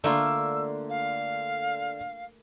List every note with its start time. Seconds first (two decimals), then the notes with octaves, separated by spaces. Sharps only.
0.04 D3 A3 A#3 F4 E6
0.89 F5